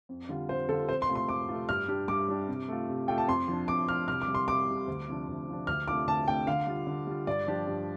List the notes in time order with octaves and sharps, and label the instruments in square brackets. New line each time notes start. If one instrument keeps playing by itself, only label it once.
[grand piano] F2
D3 G3 F4
[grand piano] F2 [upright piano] C5
[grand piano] D3 G3 F4 [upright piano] A4
[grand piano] F2 [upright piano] C5
[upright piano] C6
[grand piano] C3 A3 F4
[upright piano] C6
[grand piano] F2 [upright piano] D6
[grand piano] C3 A3 F4
[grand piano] G2 [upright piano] F6
[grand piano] G3 D4 G4
[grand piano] G2 [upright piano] D6
[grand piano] G3 D4 G4
C3
A3 F4
C3
[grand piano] A3 F4 [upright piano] G5
[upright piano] A5
[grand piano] F2 [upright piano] C6
[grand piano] F3 D4
[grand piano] F2 [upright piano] D6
[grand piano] F3 D4 [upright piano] F6
[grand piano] C2 [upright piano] F6
[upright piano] D6
[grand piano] C3 G3
[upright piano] C6
[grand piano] C2 [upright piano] D6
[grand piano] C3 G3
D2
C3 F3 D4
D2
C3 F3 D4
[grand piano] D2 [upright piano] F6
[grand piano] C3 A3 D4 F4 [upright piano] D6
[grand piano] D2 [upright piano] A5
[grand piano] C3 A3 D4 F4 [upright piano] G5
[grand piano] D3 [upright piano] F5
[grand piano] G3 F4
D3
G3 F4
[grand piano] G2 [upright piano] D5
[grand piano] F3 D4 G4
G2